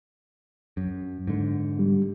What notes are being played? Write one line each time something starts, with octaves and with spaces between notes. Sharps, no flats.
F#2
G#2 D3
G3